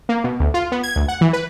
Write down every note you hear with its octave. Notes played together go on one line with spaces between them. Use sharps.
A#3
B2
D2
F4
B3
G#6
D2
F#5
E3
B4